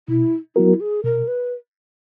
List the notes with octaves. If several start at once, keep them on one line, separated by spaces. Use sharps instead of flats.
B2 E4
F#3 B3 E4 F#4 A#4
G#4
B2 A#4
B4